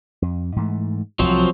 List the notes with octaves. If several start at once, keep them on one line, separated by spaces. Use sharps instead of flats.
F2
G#2 E3 A3
D1 C2 F3 F#3 C4